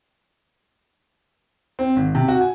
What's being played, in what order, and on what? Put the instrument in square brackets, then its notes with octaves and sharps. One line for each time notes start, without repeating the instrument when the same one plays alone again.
[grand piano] C4
G#1
C3
F#4
G#5